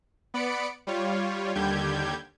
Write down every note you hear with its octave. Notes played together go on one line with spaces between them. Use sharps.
B3 D5 B5 C#7 D7
G3 F4 C#5
D#2 D3 G3 G4 G6 G#6